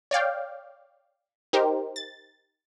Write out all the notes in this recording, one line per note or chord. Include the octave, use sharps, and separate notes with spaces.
C#5 D5 F5 G5
D#4 G4 A#4 C5
A6